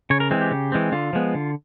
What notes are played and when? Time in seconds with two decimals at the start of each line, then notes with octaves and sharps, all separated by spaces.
0.10 C#3 C#5
0.20 A#4
0.31 E3 G#3 C4
0.41 G4
0.51 C#3
0.72 E3 G#3 C4
0.92 D3 F4
1.13 F3 G#3 B3
1.35 D3